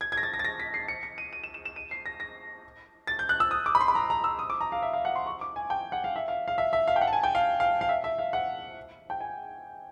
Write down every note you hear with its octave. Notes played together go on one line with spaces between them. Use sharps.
G#6
G#6
A#6
A6
A#6
A6
A#6
B6
C7
C#7
C#7
D#7
D#7
E7
E7
E7
D#7
C7
A#6
A#6
A6
G6
F#6
E6
D#6
D6
B5
C6
B5
A#5
A#5
E6
D#6
D6
A#5
F5
E5
F5
F#5
C6
C#6
D6
G#5
G5
F#5
F5
E5
F5
F5
E5
E5
F5
G5
F#5
A5
G#5
G5
F5
F5
F5
E5
E5
F5
F#5
G5
G#5